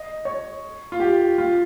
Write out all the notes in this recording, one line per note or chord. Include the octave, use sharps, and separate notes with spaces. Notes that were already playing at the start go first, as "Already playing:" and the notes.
Already playing: D#5
C#5
F4
G4
F4